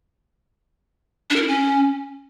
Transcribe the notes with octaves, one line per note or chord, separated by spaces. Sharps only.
D4
A#4
E4
C#4